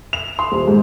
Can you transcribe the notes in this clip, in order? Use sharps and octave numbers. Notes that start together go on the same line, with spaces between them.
F7
C6
D#1
G#2